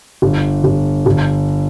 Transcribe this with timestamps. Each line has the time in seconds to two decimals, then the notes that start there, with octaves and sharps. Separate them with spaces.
0.22 G1
0.64 G1
1.06 G1